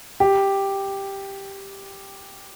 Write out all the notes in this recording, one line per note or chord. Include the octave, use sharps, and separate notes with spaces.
G4